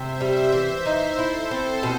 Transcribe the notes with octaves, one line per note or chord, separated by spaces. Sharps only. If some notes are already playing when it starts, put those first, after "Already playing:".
Already playing: C3 C5 E5
G3
E3 C5 E5
D#4
E4 A4 C5
C4
B2